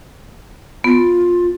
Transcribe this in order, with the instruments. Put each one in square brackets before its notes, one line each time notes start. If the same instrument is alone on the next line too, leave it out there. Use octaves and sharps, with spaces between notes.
[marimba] B3 [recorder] F4